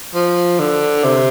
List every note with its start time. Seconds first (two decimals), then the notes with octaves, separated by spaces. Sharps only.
0.14 F3
0.59 D3
1.04 C3